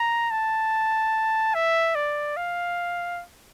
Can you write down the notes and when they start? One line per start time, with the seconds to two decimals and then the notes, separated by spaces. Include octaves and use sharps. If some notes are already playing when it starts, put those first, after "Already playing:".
Already playing: A#5
0.31 A5
1.54 E5
1.95 D5
2.37 F5